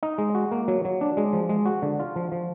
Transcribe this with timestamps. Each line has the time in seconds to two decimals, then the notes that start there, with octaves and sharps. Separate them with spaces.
0.03 D#4
0.18 G#3
0.35 F#4
0.51 A#3
0.68 F#3
0.85 F#3
1.01 D4
1.17 G#3
1.33 F3
1.49 G#3
1.66 F#4
1.82 D3
2.00 F4
2.16 F3
2.32 F3